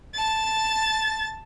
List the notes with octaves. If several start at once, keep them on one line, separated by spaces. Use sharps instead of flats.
A5 A6